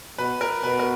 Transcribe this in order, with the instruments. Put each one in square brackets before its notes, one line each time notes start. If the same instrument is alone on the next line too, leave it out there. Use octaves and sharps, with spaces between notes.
[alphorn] B2 [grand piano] B4
[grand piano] A#4
[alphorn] B2 [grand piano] B4
[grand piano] A#4